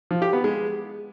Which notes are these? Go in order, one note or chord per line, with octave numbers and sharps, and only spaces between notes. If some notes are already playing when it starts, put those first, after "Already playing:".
F3
G4
B3
G#3